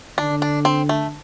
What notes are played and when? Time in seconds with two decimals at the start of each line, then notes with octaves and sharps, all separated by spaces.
0.18 D3 D4
0.42 D4
0.65 C4
0.89 A3